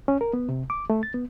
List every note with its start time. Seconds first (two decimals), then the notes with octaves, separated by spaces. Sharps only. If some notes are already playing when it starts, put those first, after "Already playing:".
0.08 C#4
0.21 A#4
0.33 B3
0.49 C3
0.70 D6
0.90 A3
1.03 A6
1.14 B3